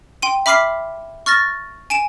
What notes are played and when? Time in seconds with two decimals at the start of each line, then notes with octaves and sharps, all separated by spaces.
0.22 G5 C6 D#7
0.46 E5 B5 D6 F6 B6 C7
1.26 C#6 F6 A6 A#6
1.90 G#5 D7 E7